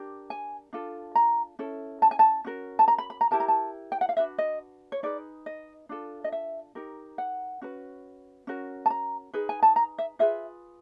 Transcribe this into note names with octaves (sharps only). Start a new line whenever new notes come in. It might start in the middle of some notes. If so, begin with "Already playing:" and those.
Already playing: D4 G4 A#4
G#5
D4 F4 A4
A#5
C#4 E4 A4
A5
G#5
A5
C#4 F#4 A#4
A5
A#5
B5
B5
A#5
E4 G4 A#4 A5
A#5
A5
G5
F#5
F5
D4 F#4 B4 E5
D#5
C#5
D#4 G#4 B4 D5
D#5
D4 F4 A4
D#5
E5
D#4 G4 A#4
F#5
C#4 F#4 B4
C#4 F#4 A#4
A5
A#5
D#4 G#4 B4
G#5
A5
A#5
E5
F4 G#4 B4 E5